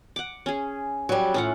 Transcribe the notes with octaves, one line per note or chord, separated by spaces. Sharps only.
F#5 D6
C#4 G#4
F#3 G3
A2 C#4 F4 F#5